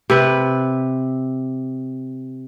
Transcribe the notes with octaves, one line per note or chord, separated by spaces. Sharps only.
C3 B4